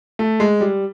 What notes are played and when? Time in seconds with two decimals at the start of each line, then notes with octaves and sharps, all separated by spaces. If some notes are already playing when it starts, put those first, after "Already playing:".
0.19 A3
0.40 G#3
0.61 G3